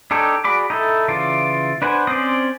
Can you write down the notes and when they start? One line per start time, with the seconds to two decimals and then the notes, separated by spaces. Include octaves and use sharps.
0.11 D4 D#4 G4 A4 C#5
0.44 F#4 G#4 D5 B5 D6
0.70 D#4 E4 A4
1.08 C#3 E3 F4 D5
1.82 D4 B4 C5 F#5 G#5
2.07 C4 C#4 C5 D5 D#6